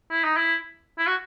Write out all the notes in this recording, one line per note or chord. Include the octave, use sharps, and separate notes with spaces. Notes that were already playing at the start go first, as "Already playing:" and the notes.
E4
D#4
E4
E4
F#4